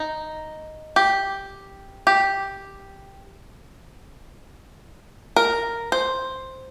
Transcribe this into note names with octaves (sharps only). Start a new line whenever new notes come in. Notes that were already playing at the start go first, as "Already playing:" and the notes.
Already playing: D#4
G4
G4
A#4
C5